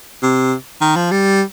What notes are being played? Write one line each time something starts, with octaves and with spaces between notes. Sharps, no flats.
C3
D#3
F3
G3